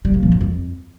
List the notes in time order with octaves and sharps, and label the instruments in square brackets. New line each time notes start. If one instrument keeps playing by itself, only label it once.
[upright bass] G3
A#2
F3
F#2
F2